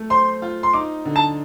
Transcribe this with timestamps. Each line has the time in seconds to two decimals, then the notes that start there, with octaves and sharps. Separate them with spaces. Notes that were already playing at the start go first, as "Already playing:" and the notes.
Already playing: A3
0.10 C5 C6
0.42 F4
0.63 C6
0.74 D#4 D6
1.05 D3
1.16 A5